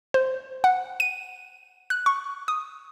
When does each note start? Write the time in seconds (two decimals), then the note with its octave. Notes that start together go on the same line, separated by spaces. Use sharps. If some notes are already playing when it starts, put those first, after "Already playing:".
0.14 C5
0.64 F#5
1.00 D#7
1.90 F#6
2.06 C#6
2.48 D#6